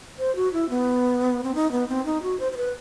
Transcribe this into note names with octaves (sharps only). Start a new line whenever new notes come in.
C5
F#4
E4
B3
C4
D#4
B3
C4
D#4
F#4
C5
C5
B4